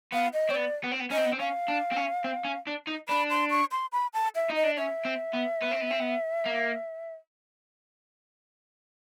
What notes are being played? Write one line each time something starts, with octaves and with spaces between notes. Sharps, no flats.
B3 F5
D#5
C4 C#5
B3 D5
B3
C4
B3
C#4 D#5
C4
B3
C4
C#4 F5
D4
C4
C#4
C4
C#4
D4
D#4
D4 B5
C6
C#6
C6
B5
A5
E5
D#4
D#5
D4
C#4 E5
C4
B3
B3
C4
B3
C4
B3
A#3